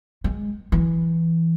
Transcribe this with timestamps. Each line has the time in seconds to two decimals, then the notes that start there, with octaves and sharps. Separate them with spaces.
0.24 G#3
0.72 E3